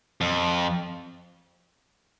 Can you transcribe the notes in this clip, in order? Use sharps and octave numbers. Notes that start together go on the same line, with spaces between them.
F2